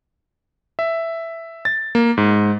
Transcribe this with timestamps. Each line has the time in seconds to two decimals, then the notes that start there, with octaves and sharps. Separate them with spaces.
0.79 E5
1.65 A6
1.95 A#3
2.17 G#2